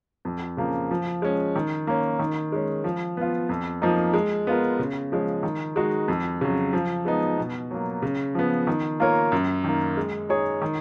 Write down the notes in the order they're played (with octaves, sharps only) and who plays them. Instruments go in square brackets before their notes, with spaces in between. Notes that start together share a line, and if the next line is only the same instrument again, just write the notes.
[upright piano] F2
C#3 F3 A#3
F3
G#3 C#4
D#3
A#3 C#4
D#3
G#3 C#4
F3
B3 F4
F2
F3 A#3 D#4
G#3
B3 F4 A#4
C#3
F3 G#3 C#4
D#3
G#3 D#4 F#4
F2
C#3 F#3
F3
G#3 B3 D#4
B2
F#3 A#3
C#3
F3 B3
D#3
A#3 F4 A#4 C#5
F#2
D#3 A#3
G#3
D#4 G#4 C#5
D#3